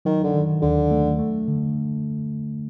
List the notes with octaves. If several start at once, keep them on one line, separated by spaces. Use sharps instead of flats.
D#3 F#3
D3
D#3
D#2 D3
A3
A3
D3